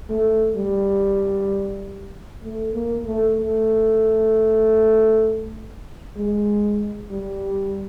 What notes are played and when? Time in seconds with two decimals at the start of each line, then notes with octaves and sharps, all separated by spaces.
0.10 A3
0.56 G3
2.43 A3
2.74 A#3
3.05 A3
3.36 A3
6.17 G#3
7.11 G3